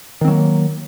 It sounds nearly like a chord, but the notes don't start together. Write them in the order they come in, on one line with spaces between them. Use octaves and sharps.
D#3 C4 F#3 A#3